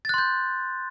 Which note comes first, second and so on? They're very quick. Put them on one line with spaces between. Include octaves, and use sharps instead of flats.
A6 F#6 C6 G6